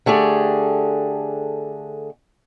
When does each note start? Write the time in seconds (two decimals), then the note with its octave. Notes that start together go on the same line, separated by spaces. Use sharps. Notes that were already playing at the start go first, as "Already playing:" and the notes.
0.06 D3 A3 G4 G#4